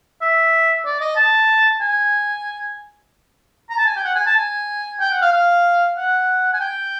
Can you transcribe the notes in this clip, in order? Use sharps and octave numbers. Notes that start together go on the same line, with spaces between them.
E5
D5
D#5
A5
G#5
A#5
A5
G#5
G5
F#5
G#5
A5
G#5
G5
F#5
F5
F5
F#5
G#5
G5